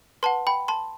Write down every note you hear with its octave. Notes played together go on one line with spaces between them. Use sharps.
B4 F#5 A5 C6
G5 B5
A5 C6